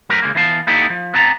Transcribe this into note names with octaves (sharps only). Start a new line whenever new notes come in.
F#3 A3 C4 A#4 B4
C#3 G#3 A#3
E3 B3 F5 A5
A#3 B3 D#4 E4 G4 A4
F3
B3 C4 A5 A#5